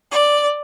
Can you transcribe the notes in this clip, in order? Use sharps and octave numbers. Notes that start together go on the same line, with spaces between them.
D5